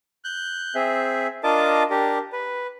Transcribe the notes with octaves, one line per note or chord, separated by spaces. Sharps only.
F#6 G6
C4 G#4 E5
D4 F4 A#4 D#5 A5 D6
D4 G4 A#4
B4